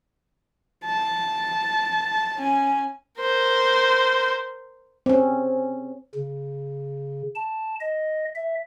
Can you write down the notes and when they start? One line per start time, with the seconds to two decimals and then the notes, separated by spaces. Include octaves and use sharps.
0.85 A5
2.37 C#4 G#5
3.19 A#4 C5
5.06 C4 C#4
6.15 C#3
7.36 A5
7.80 D#5
8.35 E5